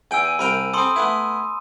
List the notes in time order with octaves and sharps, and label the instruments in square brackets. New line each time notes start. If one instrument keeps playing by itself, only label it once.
[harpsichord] E2 G5 [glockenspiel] G#5 E6
[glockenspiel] D#7
[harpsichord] C2 A#4 G5 [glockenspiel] B5
[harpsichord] C4 A4 [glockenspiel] B5 C6 D#6
[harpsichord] A3 B3 E4